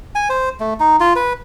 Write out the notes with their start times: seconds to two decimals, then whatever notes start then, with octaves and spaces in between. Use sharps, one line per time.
0.15 G#5
0.29 C5
0.60 A3
0.80 D#4
1.00 F4
1.16 B4